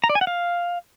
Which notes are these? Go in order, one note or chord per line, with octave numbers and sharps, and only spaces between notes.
A#5
D5
G#5
F#5
F5